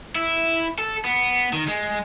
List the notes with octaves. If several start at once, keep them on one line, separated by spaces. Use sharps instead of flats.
E4
A4
B3
D#3
G#3